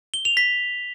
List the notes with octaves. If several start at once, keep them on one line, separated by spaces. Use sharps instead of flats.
G7
F7
B6